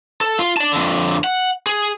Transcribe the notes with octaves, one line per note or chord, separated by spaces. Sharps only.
A4
F4
D5 A5
F2 D3
F#5
G#4